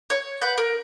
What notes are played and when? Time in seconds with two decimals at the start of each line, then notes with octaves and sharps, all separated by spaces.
0.10 C#5
0.41 B4 F#5 G6
0.58 A#4